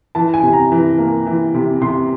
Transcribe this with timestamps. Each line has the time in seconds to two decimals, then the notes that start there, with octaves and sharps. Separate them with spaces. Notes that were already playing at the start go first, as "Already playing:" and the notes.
0.15 E3 A5
0.34 G#5
0.43 C3
0.53 A#5
0.72 E3
0.98 A#3
1.26 E3
1.54 C3
1.82 C3 C6